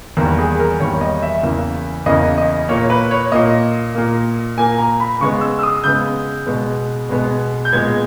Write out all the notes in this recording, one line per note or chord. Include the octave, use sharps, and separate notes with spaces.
E2 D#3 G3 A#3 A#4
G#4
A#4
E2 D#3 G3 A#3 C#5
D#5
E5
E2 C#3 E3 A#3
E2 C#3 E3 A#3 D#5
D#5
A#2 A#3 C#5
B4
C#5
A#2 A#3 D#5
A#2 A#3
A#2 A#3 G#5
A#5
B5
C#3 G#3 B3 C#6
E6
E6
D#6
C#3 G#3 B3 G6
B2 G#3 B3
B2 G#3 B3
G6
A#2 G#3 B3 G#6